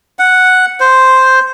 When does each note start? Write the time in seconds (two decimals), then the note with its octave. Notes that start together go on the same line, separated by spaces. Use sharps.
0.19 F#5
0.80 C5